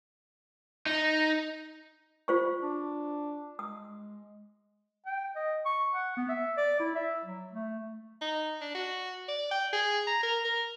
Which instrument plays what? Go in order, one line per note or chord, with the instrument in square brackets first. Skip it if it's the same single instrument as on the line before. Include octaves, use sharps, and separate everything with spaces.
[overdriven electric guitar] D#4
[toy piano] F4 C5 C#6
[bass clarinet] D4
[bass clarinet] G#3 [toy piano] D#6
[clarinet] G5
D#5
C#6
F#5
B3
E5
D5
E4
E5
F#3
A3
[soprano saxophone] D#4
D4
F#4
D5
G5
G#4
A#5
A#4
A#4